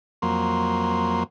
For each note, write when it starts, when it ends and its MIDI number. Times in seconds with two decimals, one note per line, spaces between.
0.22 1.23 41
0.22 1.23 54
0.22 1.23 58
0.22 1.23 84